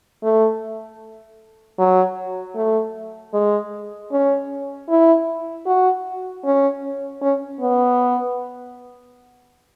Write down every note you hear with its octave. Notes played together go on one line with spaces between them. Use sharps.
A3
F#3
A3
G#3
C#4
E4
F#4
C#4
C#4
B3